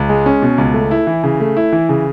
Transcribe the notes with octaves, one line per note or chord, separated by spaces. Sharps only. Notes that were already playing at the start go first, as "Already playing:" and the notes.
Already playing: C#2
G#3
C#4
B2
C#2
A3
E4
E3
C#3
A3
E4
E3
C#3